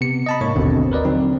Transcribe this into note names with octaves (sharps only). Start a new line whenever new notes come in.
C3 B3 C#7
D#5 A5 B5
G#2 A#3 C#5 C#6
G#1 D#2 B2 D3 C4
A#4 B4 D5 D#5
D3 F#3 C4 D#4